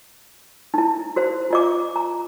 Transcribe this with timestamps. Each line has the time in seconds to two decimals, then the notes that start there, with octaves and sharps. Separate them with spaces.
0.74 D#4 E4
1.16 F#4 C5
1.50 F4 D#5 D6
1.96 A#5